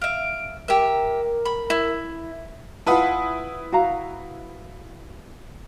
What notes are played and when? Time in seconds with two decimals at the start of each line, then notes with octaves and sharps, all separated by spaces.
0.01 E5 F5 D7
0.68 G4 A#4 E5
1.45 B5
1.70 E4
2.86 E4 F4 B4 F#5 A5 D#6
3.72 F#4 F5 A#5